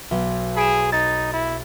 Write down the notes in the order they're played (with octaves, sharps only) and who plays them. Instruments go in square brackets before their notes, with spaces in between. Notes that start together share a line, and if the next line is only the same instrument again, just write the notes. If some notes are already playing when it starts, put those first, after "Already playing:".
[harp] B1
[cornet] G#4 [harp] B5 D7 E7
[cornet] D#4 [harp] A6
[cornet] E4